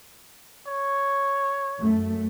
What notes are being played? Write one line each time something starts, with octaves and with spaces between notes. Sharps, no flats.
C#5
F#2 A3